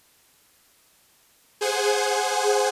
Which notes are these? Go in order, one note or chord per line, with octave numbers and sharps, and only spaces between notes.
G#4 C5 F#5 G#5